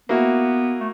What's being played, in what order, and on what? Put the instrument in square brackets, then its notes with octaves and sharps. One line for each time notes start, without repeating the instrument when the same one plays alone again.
[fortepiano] A#3 E4 F#4 [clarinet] B3
[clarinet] A3